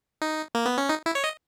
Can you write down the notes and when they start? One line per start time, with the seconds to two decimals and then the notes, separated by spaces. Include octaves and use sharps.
0.22 D#4
0.55 A#3
0.66 B3
0.78 C#4
0.89 D#4
1.06 E4
1.15 C#5
1.24 D#5